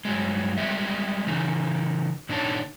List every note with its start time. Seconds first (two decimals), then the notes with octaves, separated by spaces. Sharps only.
0.05 G2 C3 F#3 G#3
0.58 G3 G#3 G4 E5
1.27 C#3 E3 D#4
2.29 A#2 D3 D4 D#4 C#5 A5